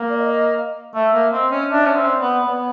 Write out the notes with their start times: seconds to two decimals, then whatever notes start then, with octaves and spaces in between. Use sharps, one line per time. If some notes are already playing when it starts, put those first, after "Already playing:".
Already playing: A#3
0.09 D5
0.18 D#5
0.94 A3 E5
1.13 A#3
1.32 C4 D#5
1.51 C#4
1.70 D4 E5
1.85 C#4
1.96 C4
2.09 D5
2.21 B3
2.46 B3 C#5